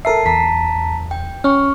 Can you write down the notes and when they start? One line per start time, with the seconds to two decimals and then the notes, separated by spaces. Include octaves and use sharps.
0.05 A4 A#4 E5 A5 C7
0.26 E2 A5 A#5 B6
1.11 G5
1.44 C#4 C#6 F6